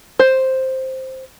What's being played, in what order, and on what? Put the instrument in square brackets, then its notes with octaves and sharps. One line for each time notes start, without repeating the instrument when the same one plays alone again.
[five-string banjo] C5